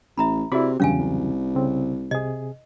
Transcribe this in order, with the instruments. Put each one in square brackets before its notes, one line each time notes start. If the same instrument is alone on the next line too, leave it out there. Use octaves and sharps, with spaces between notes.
[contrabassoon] A1 [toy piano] E5 A#5 B5
[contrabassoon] C3 [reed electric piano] E4 D5 B5 [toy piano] F#4 G#4
[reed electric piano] E2 C#3 F#3 [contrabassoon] G2 [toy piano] C#4 F5 G#5
[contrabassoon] C2
[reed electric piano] C#3 C4
[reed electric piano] C3 G#4 [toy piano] D#5